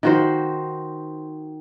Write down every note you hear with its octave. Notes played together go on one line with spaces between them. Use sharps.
D#3 F#4 C5